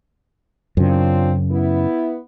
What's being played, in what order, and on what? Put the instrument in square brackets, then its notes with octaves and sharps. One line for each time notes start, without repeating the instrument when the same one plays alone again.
[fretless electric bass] F#2 C#3 [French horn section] C4 D4 F4
[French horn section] B3 E4